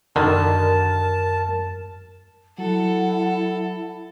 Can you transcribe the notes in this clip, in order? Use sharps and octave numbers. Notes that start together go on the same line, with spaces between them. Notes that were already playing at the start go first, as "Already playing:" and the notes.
F#2 D3 D#3 A#4 A5
F#3 E4 A4 F#5